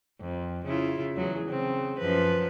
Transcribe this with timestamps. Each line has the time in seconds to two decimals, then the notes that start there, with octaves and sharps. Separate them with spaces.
0.20 F2
0.65 C#3 E4 F4
1.15 E2 F#3 G#4
1.48 C#3 C4
1.99 F#2 F3 B4